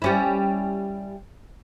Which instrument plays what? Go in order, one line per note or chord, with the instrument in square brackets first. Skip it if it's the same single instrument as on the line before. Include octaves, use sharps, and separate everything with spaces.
[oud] G3 C#4 E4